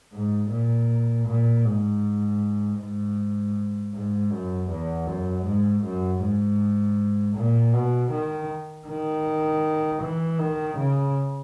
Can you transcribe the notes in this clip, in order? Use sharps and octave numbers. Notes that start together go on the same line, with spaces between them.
G#2
A#2
A#2
G#2
G#2
G#2
F#2
E2
F#2
G#2
F#2
G#2
A#2
B2
D#3
D#3
E3
D#3
C#3